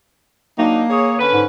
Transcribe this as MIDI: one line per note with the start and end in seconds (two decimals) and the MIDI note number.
0.59 0.84 54
0.59 1.24 58
0.59 0.84 62
0.59 0.84 63
0.90 1.14 68
0.90 1.14 73
1.19 1.43 50
1.19 1.43 61
1.19 1.43 71
1.33 1.45 44